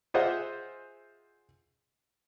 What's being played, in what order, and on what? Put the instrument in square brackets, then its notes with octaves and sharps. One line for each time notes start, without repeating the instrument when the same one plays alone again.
[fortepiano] F4 G#4 C5 D#5 E5 F#5